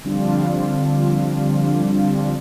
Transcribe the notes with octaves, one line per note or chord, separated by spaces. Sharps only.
D3 F3 G3 C4 D4 F4